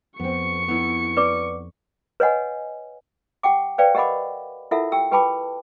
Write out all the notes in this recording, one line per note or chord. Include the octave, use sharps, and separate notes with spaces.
F2 B3 C4 C#6 C#7
B3 D#4 E4
B4 D5 D6
B4 C#5 D#5 F#5 G#5
G4 F#5 G5 D6
B4 C5 D5 F5 G5
G4 A#4 D#5 F#5 B5 D6
E4 F4 A4 A#4 E5 F#5
G4 G5 E6
G4 B4 G5 A5 B5 D6